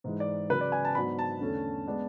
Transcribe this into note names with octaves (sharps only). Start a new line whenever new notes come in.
G#2 E3 G#3
D5
C#3 F#3 C#4 B4
D5
G#5
A5
G#2 F#3 B3 D4 B5
A5
E2 D3 A3 C#4
G#3 B3 D4